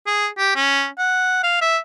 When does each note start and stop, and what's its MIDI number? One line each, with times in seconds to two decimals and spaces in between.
0.07 0.28 68
0.38 0.51 67
0.56 0.88 61
0.98 1.41 78
1.43 1.59 77
1.61 1.78 76